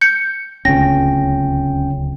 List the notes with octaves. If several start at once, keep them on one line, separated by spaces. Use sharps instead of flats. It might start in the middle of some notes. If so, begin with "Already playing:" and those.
G6 C#7
D1 C#2 C#4 G5 A#6